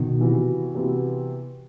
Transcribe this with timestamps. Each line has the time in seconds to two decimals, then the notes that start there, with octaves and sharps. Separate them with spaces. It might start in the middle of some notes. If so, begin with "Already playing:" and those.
Already playing: B2 D#3
0.20 C3 E3 B3 F#4
0.75 C3 E3 B3 F#4